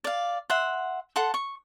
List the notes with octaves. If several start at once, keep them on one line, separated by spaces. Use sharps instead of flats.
D5 F5
E5 F#5 C6
A4 F#5 A5 C6
C#6